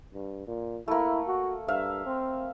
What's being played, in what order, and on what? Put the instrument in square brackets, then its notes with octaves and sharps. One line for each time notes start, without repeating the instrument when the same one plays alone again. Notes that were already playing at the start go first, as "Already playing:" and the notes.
[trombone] G2
A#2
[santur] A3 A#3 [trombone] E4
[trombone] F#4
[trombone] G2 [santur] E5 F5
[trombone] C4